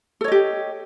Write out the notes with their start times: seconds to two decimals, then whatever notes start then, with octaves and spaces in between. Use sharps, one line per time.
0.21 A4
0.24 C#5
0.28 D#5
0.32 G4